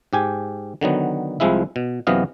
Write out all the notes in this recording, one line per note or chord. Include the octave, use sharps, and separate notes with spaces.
G#2 G4 G#5
D3 D#3 F#3 B3
C2 F3 G#3 E4 E5
B2
F#2 C3 E3 B3 D#5 F5